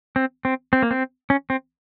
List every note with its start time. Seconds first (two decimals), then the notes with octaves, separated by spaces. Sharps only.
0.16 C4
0.45 C4
0.73 C4
0.82 A#3
0.91 C4
1.30 C#4
1.50 C4